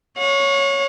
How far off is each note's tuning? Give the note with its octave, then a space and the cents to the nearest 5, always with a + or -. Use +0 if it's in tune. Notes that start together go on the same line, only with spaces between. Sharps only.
C#5 +0 F#5 -45